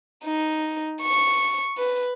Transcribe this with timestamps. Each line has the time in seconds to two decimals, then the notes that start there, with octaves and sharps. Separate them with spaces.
0.24 D#4
1.02 C#6
1.78 B4